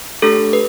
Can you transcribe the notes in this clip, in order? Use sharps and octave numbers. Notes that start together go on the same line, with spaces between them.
A3 D4 G4 A4
B4